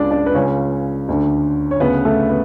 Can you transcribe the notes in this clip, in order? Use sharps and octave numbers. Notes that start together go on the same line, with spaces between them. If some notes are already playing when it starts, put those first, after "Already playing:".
Already playing: C#2 C#3 D4 D5
D4 D5
B4
C#2 C#3 C#4 C#5
D2 D3
C#5
D2 C#3 B3 B4
A3 A4
B3